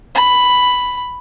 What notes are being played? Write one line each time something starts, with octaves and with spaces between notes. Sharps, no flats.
B5